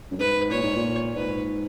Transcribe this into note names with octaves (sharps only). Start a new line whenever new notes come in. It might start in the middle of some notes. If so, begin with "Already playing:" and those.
F#2
G#2 B4
A#2 C#5
G#2
A#2
G#2 B4